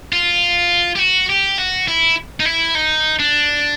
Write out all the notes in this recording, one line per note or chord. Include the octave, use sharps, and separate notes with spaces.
F4
G4
F#4
G4
F#4
E4
D#4
E4
D#4
D4